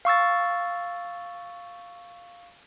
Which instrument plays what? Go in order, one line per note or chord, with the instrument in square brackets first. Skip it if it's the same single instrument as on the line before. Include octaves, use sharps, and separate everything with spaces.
[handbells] F5 C#6 E6 A6